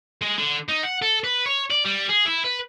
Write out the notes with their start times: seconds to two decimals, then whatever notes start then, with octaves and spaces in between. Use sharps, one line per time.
0.22 G#3
0.38 D3
0.69 D#4
0.83 F#5
1.02 A4
1.24 B4
1.46 C#5
1.70 D5
1.85 G3
2.09 G#4
2.26 E4
2.45 B4